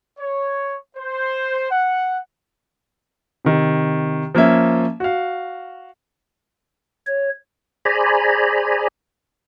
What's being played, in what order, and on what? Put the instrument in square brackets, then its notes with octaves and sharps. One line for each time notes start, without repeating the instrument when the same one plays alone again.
[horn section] C#5
C5
F#5
[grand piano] C3 D#3
F3 A#3 C#4 E5
F#4 F5
[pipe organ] C#5
[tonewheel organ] G#4 C5 D5 G#5 A#5 B5